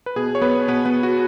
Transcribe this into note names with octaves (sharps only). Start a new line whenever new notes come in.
B4
B2 B3 G#4
C#5
B3 B4
B2 B3 B4
B3 B4
F#4